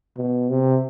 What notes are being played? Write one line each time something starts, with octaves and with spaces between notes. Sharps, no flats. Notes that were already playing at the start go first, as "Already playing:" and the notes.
B2
C3